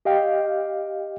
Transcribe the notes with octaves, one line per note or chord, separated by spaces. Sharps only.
G4 D#5 F5 G5